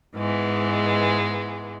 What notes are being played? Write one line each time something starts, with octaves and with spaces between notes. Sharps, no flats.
G#2 E3 G#3 B3